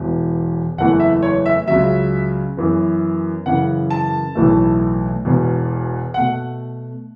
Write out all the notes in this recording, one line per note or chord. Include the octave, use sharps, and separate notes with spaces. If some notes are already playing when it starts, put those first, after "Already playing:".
Already playing: E1 E2 E3
F#1 E2 E3 A3 F#5
E5
C#5
E5
C#2 C#3 F#3 E5
F#2 E3 B3
F#2 C#3 E3 F#5
A5
B1 A2 E3 A3
E1 E2 B2 B3
B2 A3 F#5